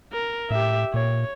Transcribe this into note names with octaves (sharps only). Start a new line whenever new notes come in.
A#4
A2 G4 E5
A#2 C#5